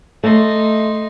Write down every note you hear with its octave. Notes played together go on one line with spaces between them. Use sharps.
A3 D#4 C6